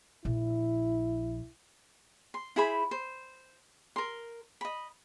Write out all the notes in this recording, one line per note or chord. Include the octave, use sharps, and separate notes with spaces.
A#1 E4
C6
E4 G#4 C5 B5
C5
A#4 C6
D#5 B5